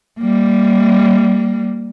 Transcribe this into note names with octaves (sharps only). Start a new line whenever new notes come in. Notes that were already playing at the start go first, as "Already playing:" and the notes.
G3 A#3